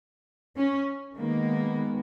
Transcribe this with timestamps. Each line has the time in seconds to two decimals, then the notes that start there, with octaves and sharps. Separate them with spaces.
0.57 C#4
1.16 D#3 G#3 A#3 B3